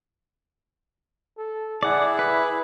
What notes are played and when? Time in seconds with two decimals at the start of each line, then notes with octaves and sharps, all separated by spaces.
1.38 A4
1.83 E4 G#4 D5 F#5
2.19 B4